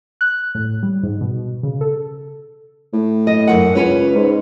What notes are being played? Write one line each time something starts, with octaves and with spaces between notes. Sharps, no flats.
F#6
A2
G3
G#2
B2
C#3
A4
A2
D#5
F#2 D#3 F#5
C#2 C#4 B4 C#5
G#2